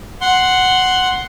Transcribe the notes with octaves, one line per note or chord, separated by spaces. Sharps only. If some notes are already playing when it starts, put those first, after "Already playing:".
F#5 C6